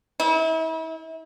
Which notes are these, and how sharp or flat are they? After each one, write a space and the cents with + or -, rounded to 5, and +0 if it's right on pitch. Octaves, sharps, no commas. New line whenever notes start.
E4 -40